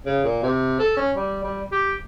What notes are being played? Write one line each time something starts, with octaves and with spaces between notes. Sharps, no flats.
C#3
A#2
C3
A4
C#4
G3
G3
G4